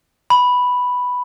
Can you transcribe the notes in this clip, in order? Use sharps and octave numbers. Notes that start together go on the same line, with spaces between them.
B5